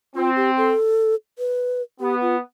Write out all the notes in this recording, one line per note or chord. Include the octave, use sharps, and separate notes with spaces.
C4 F4
G4
A4
B4
B3 G4
F4